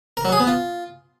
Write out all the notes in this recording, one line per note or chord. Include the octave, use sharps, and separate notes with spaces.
A#4
F#3
G#4
B3
F4